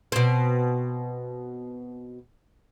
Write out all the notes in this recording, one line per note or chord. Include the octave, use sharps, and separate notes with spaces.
B2 C4